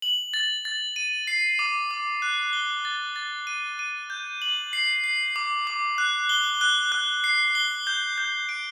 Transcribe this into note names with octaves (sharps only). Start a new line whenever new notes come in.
F#7
A6
A6
D#7
C7
D6
D6
F#6
G7
A6
A6
D#7
D#7
G6
F#7
C7
C7
D6
D6
F#6
G7
F#6
F#6
C7
G7
G6
G6
D7